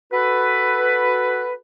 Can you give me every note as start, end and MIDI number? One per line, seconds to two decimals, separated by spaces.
0.12 1.55 66
0.12 1.55 69
0.12 1.55 71